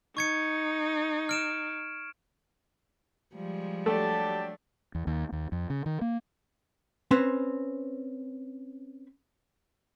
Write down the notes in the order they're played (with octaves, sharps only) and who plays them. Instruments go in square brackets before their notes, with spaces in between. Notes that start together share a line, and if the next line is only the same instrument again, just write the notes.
[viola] D#4 [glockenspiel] C#6 G#6 C#7
[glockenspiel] F6 D7 E7
[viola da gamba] F3 G3 G#3
[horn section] F#3 D4 G4 [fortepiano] A3 [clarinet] A5
[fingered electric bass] E2
D#2
D#2
F2
C#3
D#3
A#3
[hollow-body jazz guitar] C4 C#4 B4 C5